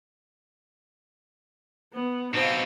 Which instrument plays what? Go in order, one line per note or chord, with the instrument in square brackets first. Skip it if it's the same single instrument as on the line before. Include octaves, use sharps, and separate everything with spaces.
[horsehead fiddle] B3
[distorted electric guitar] B2 C4 [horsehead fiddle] D#4 [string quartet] C5 F5